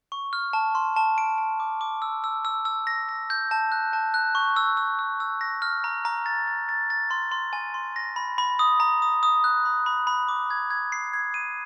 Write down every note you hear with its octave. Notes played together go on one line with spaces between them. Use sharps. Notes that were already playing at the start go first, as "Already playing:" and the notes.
C#6
F6
A5
C6
A5
D7
D7
D6
D6
E6
E6
E6
E6
A#6
A#6
G6
A5
F#6
A5
F#6
C#6
E6
E6
E6
E6
A#6
F6
A#5
A#5
A6
A6
A6
A6
C6
C6
G#5
C6
A#6
B5
B5
D#6
A#5
D#6
D#6
F#6
B5
B5
B5
D6
G#6
G#6
C7
G#6
D#7